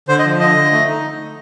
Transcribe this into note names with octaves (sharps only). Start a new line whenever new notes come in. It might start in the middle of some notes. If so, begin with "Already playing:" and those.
D3 C5
D#5
F3
D3 D#5
D3
A3
D#4